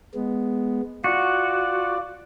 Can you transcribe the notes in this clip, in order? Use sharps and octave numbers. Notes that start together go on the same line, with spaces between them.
G#3 B3
F4 F#4 D5